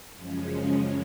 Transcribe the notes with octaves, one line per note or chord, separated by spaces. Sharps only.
F#2 C#3 F3 G#3 C#4